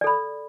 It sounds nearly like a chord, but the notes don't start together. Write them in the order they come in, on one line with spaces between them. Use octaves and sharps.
D5 A4 B5